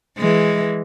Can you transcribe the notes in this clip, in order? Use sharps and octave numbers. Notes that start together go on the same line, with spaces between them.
E3 G#3